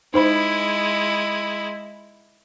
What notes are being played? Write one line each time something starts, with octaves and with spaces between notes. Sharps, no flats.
G#3 D#4 E4 C5 B5